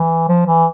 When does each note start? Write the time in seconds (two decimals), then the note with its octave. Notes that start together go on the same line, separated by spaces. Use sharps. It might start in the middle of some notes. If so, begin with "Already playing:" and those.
Already playing: E3
0.28 F3
0.47 E3